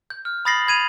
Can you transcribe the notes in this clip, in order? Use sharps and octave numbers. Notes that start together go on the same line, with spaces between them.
G6
F6
B5 D#6 A6 A#6 C7 F#7
B5 G#6 D#7 F7